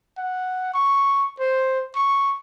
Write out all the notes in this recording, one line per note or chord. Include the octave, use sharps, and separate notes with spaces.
F#5
C#6
C5
C#6